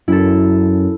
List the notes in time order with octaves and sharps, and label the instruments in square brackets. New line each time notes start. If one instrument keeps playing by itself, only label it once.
[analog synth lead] F#2 [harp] E4 A4